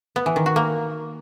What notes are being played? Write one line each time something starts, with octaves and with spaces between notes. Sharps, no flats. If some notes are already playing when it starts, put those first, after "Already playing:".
B3
E3
D#3
F#4
A#3